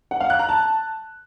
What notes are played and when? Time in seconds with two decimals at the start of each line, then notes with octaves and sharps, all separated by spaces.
0.11 F#5
0.21 F5
0.30 F#6
0.39 A#5
0.49 A5